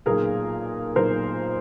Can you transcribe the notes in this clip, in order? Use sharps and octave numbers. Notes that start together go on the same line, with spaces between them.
B1 A#2 G#4 A#4
B1 A#2 A#4 C5